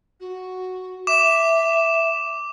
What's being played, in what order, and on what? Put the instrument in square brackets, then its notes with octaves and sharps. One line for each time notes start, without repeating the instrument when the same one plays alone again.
[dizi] F#4
[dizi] E5 [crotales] D6 E7